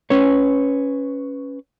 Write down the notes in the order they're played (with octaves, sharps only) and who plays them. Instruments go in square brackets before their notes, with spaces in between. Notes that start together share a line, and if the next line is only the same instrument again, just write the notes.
[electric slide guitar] C#4 B4 C#5